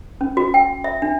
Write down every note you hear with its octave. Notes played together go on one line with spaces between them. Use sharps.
C#4
F#4
G5
E5
D4